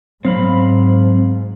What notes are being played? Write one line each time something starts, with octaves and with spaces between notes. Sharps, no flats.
G#2 F#3 C4 F5 B5